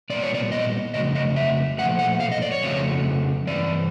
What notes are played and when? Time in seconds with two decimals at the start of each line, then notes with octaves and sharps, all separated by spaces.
0.10 A#2 G3 B3 D5
0.22 C#5
0.35 D5
0.52 D#5
0.94 F2 C#3 F#3 A3 D#5
1.15 D#5
1.36 E5
1.78 A#2 F3 A3 F#5
1.99 F#5
2.20 F5
2.32 D#5
2.42 D5
2.52 C#5
2.63 F2 C#3 F#3 A3
3.47 G2 E3 D5